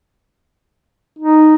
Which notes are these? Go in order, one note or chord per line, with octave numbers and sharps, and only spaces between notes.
D#4